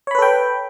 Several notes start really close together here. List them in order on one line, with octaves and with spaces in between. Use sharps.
C#5 B5 B4 A4 G5